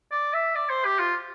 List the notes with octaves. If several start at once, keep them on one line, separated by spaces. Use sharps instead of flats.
D5
E5
D5
C5
G4
F4